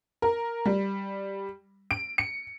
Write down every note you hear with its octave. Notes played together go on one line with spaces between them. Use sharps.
A#4
G3
D7
C#7